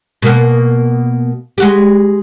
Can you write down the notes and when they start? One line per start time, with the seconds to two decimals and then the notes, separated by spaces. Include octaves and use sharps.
0.22 B2 A#3 B3
1.58 G#3 F#4 G4